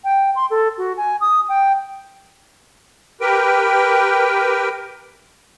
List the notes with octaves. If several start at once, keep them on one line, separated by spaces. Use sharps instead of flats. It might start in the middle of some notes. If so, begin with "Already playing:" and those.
G5
C6
A4
F#4
G#5
D#6
G5
G4 A#4 B4 G5